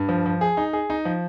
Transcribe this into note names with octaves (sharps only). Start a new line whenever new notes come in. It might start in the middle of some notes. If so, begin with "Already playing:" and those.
Already playing: G2
F3
F3
G#4
D#4
G#4
D#4
F3